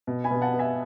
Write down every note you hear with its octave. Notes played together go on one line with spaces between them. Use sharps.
B2
G#5 B5
B2
F#5 A5
B3
E5 G#5